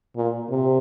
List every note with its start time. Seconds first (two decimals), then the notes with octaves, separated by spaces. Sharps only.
0.16 A#2
0.50 C3